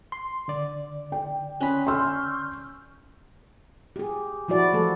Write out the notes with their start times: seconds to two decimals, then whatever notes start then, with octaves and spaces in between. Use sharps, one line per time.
0.12 C6
0.48 D3 D5
1.12 G5
1.61 C#4 B5 C6 D#6 F#6
1.87 C6 C#6 E6 F6 G6
3.96 G4 G#4
4.48 F3 E4 F#4 D5
4.73 F3 A3 A4